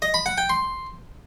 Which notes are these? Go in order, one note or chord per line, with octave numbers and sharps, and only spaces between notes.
D#5
B5
F#5
G5
C6